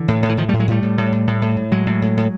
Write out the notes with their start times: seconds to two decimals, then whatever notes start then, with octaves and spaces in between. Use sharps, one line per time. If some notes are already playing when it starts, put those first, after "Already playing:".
Already playing: D3 E3
0.08 A2
0.23 A2
0.29 E3
0.37 A2 D#3 F3
0.49 A2 G3 A3
0.60 F#3 G#3
0.68 A2 G3 A3
0.82 A2
0.98 A2
1.12 A2
1.27 A2
1.42 A2
1.56 A2
1.71 A2 F#3 G#3
1.86 A2
2.02 A2
2.17 A2